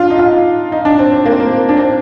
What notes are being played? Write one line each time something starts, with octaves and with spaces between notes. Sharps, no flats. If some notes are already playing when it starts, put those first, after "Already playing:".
Already playing: D4 F4
D#4
F4
D#4
D4
C4
C4
A#3
C4
A#3
D4
C4